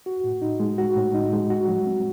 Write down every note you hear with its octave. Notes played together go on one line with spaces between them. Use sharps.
F#4
A2
D#4
G#3
F#4
A2
D#4
G#3
F#4
F#3
C4